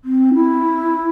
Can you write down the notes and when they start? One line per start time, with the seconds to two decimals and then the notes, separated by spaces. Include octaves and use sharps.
0.05 C4
0.34 E4